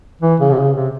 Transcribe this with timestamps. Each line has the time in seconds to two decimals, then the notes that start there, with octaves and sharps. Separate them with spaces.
0.22 E3
0.40 C#3
0.51 C3
0.58 C#3
0.76 C3